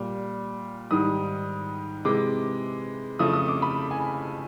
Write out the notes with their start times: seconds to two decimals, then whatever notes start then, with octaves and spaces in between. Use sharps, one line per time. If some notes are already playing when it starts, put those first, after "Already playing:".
Already playing: A#2 G3
0.91 G#2 D#3 G3 D#6
2.05 C3 E3 G#3 D6
3.19 F2 C#3 F3 A3 D#6
3.33 D#6
3.48 D6
3.62 B5
3.91 G#5